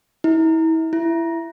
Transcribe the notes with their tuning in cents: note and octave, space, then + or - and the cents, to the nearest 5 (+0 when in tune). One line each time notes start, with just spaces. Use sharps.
E4 -35
E4 +15